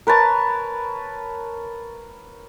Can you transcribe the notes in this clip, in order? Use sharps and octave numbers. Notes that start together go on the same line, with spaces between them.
A#4 B4 C#5 A5